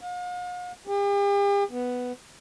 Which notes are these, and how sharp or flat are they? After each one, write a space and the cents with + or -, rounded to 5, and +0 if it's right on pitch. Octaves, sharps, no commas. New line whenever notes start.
F5 +45
G4 +45
B3 +5